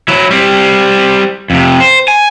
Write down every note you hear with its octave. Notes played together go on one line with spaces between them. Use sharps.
F#3 E4
G3 C4
F2 C3
C5
G#5